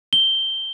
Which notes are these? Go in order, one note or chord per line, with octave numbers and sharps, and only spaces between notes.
G7